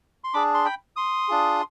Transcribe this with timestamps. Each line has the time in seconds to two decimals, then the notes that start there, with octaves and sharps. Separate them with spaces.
0.24 C6
0.34 D4 G#4 B5 D6
0.54 C6
0.65 G5 B5
0.96 C6 D#6
1.28 D4 F4 G#4